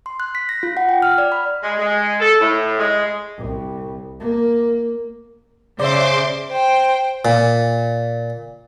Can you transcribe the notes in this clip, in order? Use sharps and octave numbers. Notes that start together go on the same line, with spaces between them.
C6
F#6
B6
A#6
F4
F#5
G5
F6
D5
B5
G#3
G#3
A4
A2
G#3
C2
A#3
C#3 C5 D5 E5 C6 D6
C5 G5
A#2